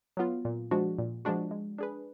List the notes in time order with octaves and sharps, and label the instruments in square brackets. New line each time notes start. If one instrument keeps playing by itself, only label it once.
[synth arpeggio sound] F#3 B3 F4
A#2
F3 G#3 D4 F#4
A#2
F3 G#3 D4 F#4
G#3
D4 G#4 B4